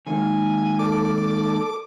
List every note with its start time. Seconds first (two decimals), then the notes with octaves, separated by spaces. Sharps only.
0.07 D#3 G#3 A#3 G#5
0.79 A4 D5 D6